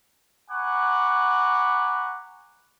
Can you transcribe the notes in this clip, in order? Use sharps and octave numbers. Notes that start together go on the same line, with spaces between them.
F#5 G#5 A#5 B5 C#6 D6